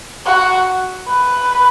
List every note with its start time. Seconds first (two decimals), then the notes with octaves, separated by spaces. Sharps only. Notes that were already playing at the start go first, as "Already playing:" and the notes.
0.26 F#4
1.07 B4